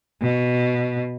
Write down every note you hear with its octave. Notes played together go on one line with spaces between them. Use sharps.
B2